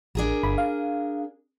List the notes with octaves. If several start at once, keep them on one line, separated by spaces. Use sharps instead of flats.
A1 D4 G#4 A#4
G1 B5
F5